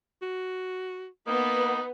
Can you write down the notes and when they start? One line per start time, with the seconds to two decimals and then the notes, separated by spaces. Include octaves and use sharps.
0.22 F#4
1.27 A#3 B3 D#4